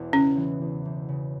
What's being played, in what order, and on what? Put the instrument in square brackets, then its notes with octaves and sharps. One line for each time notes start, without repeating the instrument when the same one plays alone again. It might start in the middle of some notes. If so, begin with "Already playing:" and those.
Already playing: [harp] E1 E2
[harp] C#3 [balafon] C#4
[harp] E3
E2
E1
C#3